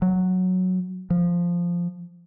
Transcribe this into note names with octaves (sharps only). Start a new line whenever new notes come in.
F#3
F3